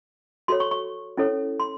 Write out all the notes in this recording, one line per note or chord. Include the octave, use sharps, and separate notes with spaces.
F#4 A4 C#5 C6
C#6
C#6
C#4 E4 A4 C#5
C6